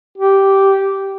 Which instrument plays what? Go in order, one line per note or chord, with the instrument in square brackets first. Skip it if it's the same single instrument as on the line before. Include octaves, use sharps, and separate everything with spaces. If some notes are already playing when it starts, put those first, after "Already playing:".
[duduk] G4